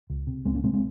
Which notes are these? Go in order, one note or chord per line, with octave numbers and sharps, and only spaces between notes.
C#2
C3
C#2 G#3 C4
A#3 C#4
C3 G#3 C4
G#3 C4